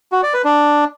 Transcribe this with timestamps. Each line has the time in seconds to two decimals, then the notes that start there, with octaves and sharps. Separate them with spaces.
0.12 F#4
0.23 D5
0.34 B4
0.44 D4